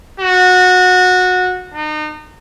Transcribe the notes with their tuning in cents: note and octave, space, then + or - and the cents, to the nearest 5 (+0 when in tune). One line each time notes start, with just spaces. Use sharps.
F#4 -20
D#4 -35